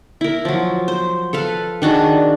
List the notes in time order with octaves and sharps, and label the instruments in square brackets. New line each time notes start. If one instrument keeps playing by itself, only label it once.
[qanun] E4 A#4
F3 F#3
C5
A4 B4 F5
D#3 D4 F#4 G#4